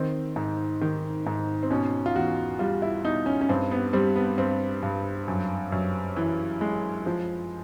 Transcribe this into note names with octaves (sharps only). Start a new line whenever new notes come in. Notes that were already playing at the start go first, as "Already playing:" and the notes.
Already playing: D#3 C4
G#2
D#3
G#2
C4
B2 C#4
F4
E2 F#4
G3 F4
E4
B2 D#4
C#4
C#4
G2 C4
B3
G3 C4
B3
G2 C4
G2
F#2
F#2
E3
G#3
F3